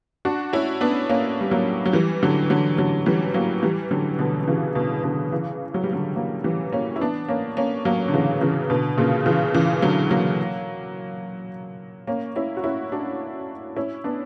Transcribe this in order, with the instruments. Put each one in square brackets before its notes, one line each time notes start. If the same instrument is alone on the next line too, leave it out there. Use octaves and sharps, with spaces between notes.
[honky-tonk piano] D4 F#4
C#4 E4
B3 D4
A#3 C#4
G3
F#3 A#3
F#3
E3 G3
D3 F#3
D3 F#3
D3 F#3
E3 G3
F#3 A#3
E3 G3
D3 F#3
B2 D3
D3
C#3 E3
B2 D3
B2 D3
C#3 E3
F#3
G3
D3 F#3
F#3 A#3
E3 G3
A#3 C#4
E4
B3 D4
A#3 C#4
A#3 C#4
F#3 A#3
D3
C#3 E3
C#3 E3
B2 D3
A#2 C#3
C#3 E3
C#3 E3
D3 F#3
F#3 A#3
A#3 C#4
C#4 E4
F#4
C#4 E4
D4 F#4
C#4 E4
B3 D4